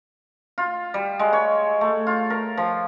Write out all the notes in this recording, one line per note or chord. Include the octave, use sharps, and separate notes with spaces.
F4
G3
G#3
C#5
A3
F4
A#4
F3